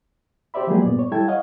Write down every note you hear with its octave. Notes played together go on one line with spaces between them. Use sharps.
G4 C5 D5 E5 B5
F3 F#3 G#3 A#3 G4 G#4
G2 A#2 B3 D5
C#5
G3 E4 A4 G5 A5 G#6
C#5 D#5 F5 F#5